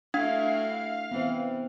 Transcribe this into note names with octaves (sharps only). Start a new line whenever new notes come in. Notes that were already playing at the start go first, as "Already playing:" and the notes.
A3 D4 E4 F#4 F5
E3 B3 C4